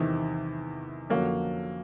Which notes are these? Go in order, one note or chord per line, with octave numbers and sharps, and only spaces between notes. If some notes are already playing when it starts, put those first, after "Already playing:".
Already playing: E2 C3 D#3
F2 D3 F#3 A#3 C#4